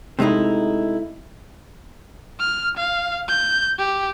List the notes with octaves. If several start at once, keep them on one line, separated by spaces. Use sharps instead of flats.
C3 G#3 A3 D#4 E4
F6
F5
G6
G4